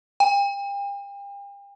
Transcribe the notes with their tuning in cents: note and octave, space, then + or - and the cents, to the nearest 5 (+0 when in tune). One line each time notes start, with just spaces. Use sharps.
G5 +40